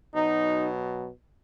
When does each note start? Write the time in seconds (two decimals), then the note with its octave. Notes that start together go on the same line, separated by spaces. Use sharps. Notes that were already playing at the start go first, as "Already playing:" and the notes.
0.15 B2 F#3 D#4